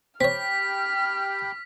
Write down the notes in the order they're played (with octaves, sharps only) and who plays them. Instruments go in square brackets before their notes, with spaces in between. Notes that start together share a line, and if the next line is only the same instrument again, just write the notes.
[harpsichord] C4 C#5 [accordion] G4 G5 B5 [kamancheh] F6 [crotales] B6